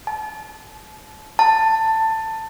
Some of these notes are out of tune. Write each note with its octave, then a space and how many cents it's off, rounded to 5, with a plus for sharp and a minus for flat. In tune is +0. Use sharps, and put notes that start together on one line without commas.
A5 -30
A5 +15